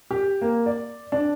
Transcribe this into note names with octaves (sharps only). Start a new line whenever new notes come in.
G4
A#3
D5
D4